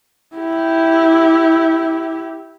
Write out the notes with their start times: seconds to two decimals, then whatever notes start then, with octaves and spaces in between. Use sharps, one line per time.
0.35 E4 G4